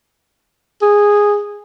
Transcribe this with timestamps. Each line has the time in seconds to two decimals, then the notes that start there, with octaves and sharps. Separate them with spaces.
0.82 G#4